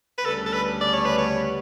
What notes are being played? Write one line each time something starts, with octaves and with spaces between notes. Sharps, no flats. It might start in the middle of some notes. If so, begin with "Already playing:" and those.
B4
D2 C#3 G3 B3 D4 A4
A4
B4
D5
C#5
B4
C#5